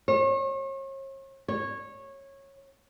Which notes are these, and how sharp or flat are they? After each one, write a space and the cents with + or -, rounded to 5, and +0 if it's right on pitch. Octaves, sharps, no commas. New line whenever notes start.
C#5 -40
C#5 -15